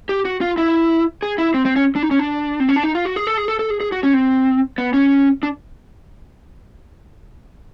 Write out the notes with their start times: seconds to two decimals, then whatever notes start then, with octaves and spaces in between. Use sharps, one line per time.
0.09 G4
0.25 F#4
0.41 F4
0.58 E4
1.22 G#4
1.38 E4
1.54 C4
1.65 C4
1.76 C#4
1.96 D4
2.03 D#4
2.11 C#4
2.19 D4
2.60 C4
2.69 C#4
2.76 D4
2.84 D#4
2.95 F4
3.05 F#4
3.16 G#4
3.27 A4
3.38 G#4
3.48 A4
3.59 A4
3.70 G#4
3.80 G#4
3.92 F#4
4.03 C#4
4.14 C4
4.78 B3
4.94 C#4
5.43 D4